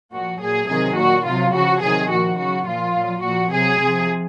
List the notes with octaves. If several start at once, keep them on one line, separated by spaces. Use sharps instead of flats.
A#2 F3 F#4
A#2 F#3 G#4
C3 D#3 F#3 G#4
A#2 F#3 F#4
C3 F#3 F4
C#3 F3 F#4
C3 D#3 F#3 G#4
A#2 F3 F#4
C#3 F#3 F#4
A#2 F3 F4
A#2 F#3
A#2 F3 F#4
C3 F#3 G#4
C3 F3